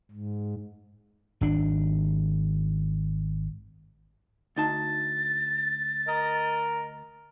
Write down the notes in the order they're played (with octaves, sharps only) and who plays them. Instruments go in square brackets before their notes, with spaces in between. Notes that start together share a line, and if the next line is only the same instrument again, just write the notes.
[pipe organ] G#2
[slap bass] G#1 D4
[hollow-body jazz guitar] D2 D#4 A5 [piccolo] A6
[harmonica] A#4 D#5